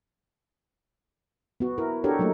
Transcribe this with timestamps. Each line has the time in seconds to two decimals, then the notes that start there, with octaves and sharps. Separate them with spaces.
1.60 B3 F#4
1.78 E4 A#4
2.04 D4 F#4 G4 A4 A#4 C#5
2.19 F#3 A3 A#3 D#4